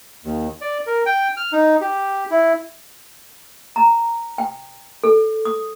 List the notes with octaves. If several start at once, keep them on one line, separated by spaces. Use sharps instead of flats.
D#2
D5
A#4
G5
F6
D#4
G4
E4
A#5
G5
A4
D#6